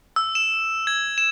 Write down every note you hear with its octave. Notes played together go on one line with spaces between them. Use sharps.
E6
E7
G#6
E7